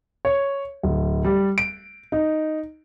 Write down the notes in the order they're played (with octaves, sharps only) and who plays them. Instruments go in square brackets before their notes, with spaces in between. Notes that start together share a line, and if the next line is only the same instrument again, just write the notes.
[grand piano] C#5
D1
G3
D7
D#4